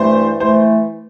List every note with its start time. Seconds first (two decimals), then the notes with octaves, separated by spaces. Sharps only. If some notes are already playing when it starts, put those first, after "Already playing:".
Already playing: G2 E3 A3 C5
0.40 E3 A3 C5